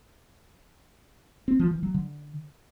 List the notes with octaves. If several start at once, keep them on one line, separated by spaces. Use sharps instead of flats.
C4
F3
E3
F#3
D3